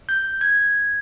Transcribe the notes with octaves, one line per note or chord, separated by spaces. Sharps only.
G6
G#6